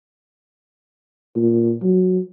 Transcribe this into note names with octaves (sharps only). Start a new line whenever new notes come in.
A#2
F#3